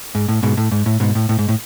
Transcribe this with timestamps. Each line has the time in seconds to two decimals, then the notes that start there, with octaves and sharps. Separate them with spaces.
0.15 G#2
0.28 A2
0.43 G#2 B2
0.57 A2
0.72 G#2
0.86 A2
1.00 G#2 B2
1.15 A2
1.29 A2
1.39 G#2
1.49 A2